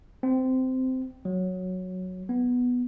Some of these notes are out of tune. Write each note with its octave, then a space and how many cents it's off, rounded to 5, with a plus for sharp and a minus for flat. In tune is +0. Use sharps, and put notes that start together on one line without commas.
C4 -15
F#3 -5
B3 +0